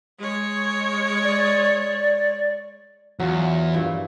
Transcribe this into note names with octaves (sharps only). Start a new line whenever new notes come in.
G#3 C#5
D5
E2 F#3 F4
G2 A#2 E3